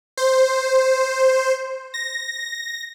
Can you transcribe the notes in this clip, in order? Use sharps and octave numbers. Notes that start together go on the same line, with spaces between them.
C5
A#6